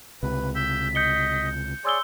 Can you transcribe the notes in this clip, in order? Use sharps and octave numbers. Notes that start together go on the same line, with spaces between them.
C#2 C3 B4
E6 G6 B6
D#5 G6 C#7 G7
G#4 C#5 D5 C6 E6 G7